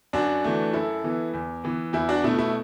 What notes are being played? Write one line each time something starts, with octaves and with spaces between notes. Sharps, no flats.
F#2 D4 F#4
E3 A3
F#2 E4 A4
E3 B3
E2
E3 B3
E2 E4
D4 F#4
B2 A3 E4
E4